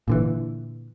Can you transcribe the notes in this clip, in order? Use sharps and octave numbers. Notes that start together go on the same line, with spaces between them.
A#2 D3 E3